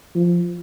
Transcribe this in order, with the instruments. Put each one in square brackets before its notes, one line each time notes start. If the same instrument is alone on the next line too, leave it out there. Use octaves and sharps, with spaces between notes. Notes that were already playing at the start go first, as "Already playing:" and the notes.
[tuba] F3